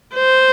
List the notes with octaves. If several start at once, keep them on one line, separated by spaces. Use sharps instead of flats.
C5